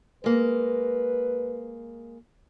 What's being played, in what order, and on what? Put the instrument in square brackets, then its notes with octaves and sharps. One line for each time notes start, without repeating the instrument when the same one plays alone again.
[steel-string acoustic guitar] G#3 A#3 [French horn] B4